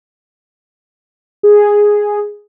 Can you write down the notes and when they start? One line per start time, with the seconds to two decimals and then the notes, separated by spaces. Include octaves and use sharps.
1.43 G#4